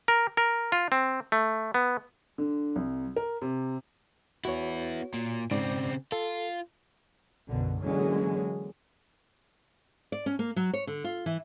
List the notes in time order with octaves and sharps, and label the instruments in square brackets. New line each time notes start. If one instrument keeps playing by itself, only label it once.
[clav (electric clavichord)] A#4
A#4
F4
C4
A3
B3
[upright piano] D3
C2
A#4
C3
[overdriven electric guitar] B3 E4 [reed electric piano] F#4 C#5
[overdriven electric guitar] A#2
[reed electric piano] G#2 D5 D6 [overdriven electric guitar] C#3 C4
[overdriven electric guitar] F4 [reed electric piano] A4
[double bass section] B1 F#2 B2 D3
D3 E3 F#3 G#3 A#3 C#4
[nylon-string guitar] D5
C#4
A#3
F#3
C#5
D3
F4
E3